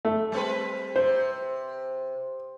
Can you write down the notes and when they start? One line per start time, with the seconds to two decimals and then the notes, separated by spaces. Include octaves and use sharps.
0.05 A3
0.32 G3 C4 B4
0.96 C3 C5